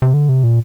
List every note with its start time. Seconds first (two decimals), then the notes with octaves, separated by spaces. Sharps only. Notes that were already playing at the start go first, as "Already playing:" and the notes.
0.02 C3
0.13 D3
0.29 C3
0.44 A#2